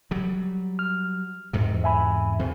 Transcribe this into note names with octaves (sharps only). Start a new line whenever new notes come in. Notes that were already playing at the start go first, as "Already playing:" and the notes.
F#3 G3
F6
E2 G#2 C3
E5 G#5 B5
E2 C4